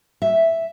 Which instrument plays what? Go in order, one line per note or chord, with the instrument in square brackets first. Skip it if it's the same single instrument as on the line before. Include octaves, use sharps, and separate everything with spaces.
[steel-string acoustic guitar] E5